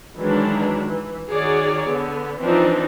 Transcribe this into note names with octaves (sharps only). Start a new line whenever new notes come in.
D#3 E3 F#3 G#3 D4
E3
D#3 F#4 G#4 C#5 D5
D3 B3
E3 F3 C4 D4 D#4 F4